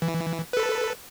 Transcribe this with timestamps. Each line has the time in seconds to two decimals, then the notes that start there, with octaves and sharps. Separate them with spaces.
0.02 E3
0.53 A4 B4